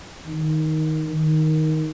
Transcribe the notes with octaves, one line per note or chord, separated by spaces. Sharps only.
D#3
D#3